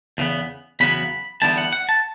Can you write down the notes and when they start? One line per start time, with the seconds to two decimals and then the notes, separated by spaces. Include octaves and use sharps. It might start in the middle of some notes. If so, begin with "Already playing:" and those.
0.18 E2 C#3 B3
0.80 E2 C#3 F#3 B3 B5
1.42 E2 D3 G3 B3 E4 A5
1.58 F#5
1.73 F#5
1.89 A5